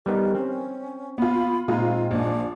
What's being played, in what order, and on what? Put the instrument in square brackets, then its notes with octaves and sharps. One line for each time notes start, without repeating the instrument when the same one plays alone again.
[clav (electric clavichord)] G3 B3 D#4 [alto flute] A#4
[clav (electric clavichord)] C4 [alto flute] C#4
[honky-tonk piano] B3 F4 [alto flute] B5
[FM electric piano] A#2 [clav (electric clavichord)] G#3 D#4 [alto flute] C4 [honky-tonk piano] F4
[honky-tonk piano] A#1 [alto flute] D4